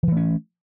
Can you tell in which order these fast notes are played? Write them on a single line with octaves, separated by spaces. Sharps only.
F3 E3 A3 C#4